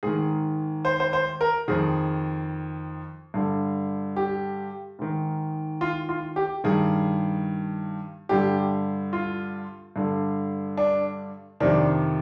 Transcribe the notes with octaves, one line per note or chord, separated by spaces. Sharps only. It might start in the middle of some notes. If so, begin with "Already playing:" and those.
G#2 D#3 G#4
C5
C5
C5
A#4
F2 D#3 G#4
G2 D3
G4
G#2 D#3
F4
F4
G4
G2 D#3 G#4
G2 D3 G4
F4
G2 D3
D4
F2 C3 D#3 D4